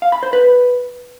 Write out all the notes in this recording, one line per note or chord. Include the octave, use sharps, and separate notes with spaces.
F5
B5
C5
B4